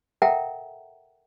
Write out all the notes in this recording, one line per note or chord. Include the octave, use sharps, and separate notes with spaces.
A4 A#4 E5 F#5 G5 A#5